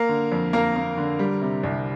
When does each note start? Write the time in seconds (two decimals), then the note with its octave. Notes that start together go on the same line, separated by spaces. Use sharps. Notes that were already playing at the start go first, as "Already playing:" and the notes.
Already playing: A#3 A#4
0.09 D3
0.32 F2
0.53 F2 A#3 A#4
0.76 A#3
0.97 D3
1.19 G3
1.42 C3
1.63 C2